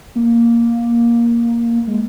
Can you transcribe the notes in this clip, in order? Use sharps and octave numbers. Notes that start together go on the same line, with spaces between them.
A#3
G#3